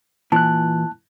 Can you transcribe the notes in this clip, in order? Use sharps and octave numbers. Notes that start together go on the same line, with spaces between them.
A#2 E3 A5 F#6